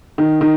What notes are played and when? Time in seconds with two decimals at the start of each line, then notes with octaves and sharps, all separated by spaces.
0.18 D#3
0.41 D#3